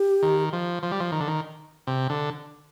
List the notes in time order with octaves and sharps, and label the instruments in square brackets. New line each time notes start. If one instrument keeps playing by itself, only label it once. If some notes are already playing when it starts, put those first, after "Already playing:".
Already playing: [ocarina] G4
[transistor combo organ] D#3
F3
F3
G3
F3
D#3
D3
D#3
C3
D3